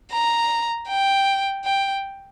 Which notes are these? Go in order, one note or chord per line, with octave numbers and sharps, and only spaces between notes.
A#5
G5
G5